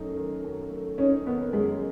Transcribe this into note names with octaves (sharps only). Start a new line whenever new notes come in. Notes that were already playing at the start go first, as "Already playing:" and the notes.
Already playing: F#2 A3 D#4
D#3
F#2
A3
C#4 D#4
D#3 B3
F#2 G#3